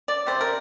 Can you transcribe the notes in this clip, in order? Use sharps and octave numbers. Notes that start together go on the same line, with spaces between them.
D5
C3 G3 C5
A#4